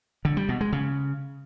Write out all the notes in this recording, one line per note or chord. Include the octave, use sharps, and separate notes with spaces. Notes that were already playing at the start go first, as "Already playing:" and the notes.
D3
G3
B2
G#3
C#3